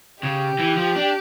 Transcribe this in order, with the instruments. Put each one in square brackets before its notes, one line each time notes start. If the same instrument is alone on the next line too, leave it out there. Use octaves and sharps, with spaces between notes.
[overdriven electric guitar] C#3 [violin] G4
[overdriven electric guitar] E3
F3
D4